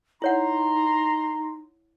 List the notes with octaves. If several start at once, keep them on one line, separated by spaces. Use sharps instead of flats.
D#4 E4 C#5 F#5 A#5 C6